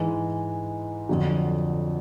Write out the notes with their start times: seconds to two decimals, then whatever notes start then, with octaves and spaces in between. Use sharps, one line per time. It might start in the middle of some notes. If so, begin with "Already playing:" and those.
Already playing: G#2 E3 G#3
1.09 F2 D3 F#3